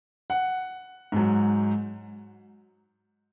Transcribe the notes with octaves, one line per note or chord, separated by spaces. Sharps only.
F#5
G#2 F#3